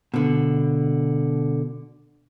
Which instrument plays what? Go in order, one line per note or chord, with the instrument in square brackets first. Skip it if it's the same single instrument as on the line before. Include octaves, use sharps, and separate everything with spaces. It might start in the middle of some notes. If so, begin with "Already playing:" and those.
[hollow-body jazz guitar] B2 D3